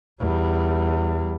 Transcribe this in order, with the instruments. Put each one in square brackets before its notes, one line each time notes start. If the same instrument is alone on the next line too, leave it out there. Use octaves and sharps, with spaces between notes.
[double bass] E2 G3